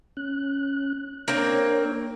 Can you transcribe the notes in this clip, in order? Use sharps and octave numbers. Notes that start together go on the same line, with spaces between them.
C#4 F#6
A#3 C4 D4 A#4 C#5